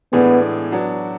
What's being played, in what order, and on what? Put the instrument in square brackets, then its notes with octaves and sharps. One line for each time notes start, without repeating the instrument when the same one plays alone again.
[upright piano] A2 E3 G#3 D4 G#4 [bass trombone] B3
[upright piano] F#3 B3 D4 F#4